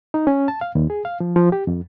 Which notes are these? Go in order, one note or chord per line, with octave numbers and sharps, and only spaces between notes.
D#4
C#4
A5
F5
D#2
G#4
F5
F3
F3
G4
F2